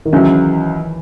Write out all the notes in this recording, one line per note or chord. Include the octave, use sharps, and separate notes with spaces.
D#3
C#2 C#3 E3 F#3 C#4